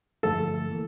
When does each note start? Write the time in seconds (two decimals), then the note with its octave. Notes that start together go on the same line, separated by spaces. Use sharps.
0.23 G2 D3 F3 A3 A4
0.69 E3 A#3